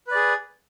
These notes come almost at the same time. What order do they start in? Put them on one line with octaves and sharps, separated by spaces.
B4 D5 G#4